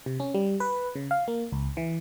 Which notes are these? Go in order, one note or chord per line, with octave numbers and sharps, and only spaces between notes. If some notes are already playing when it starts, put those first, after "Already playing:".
C3
C#4
G3
B4
C#3
F5
A#3
C#2
E3